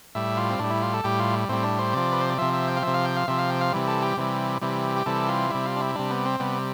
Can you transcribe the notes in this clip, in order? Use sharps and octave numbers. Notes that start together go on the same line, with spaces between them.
A2 G3 E5
F4
C4
A2 G3 D4
E4
F4
A4
A2 G3 G4
F4
A2 G3 C4
D4
C5
C3 F3 D5
B4
C5
D5
C3 F3 E5
E5
G5
F5
C3 F3 E5
F5
G5
F5
C3 F3 E5
F5
G5
F5
C3 E3 G3
A4
G4
C3 E3 G3
C3 E3 G3
G4
C3 E3 G3 A4
F4
C3 G3 E4
F4
D4
E4
C3 G3 D4
B3
C4
C3 G3 B3